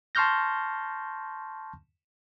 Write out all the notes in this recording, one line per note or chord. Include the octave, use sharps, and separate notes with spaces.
A5 C6 C#6 F6 G6 A#6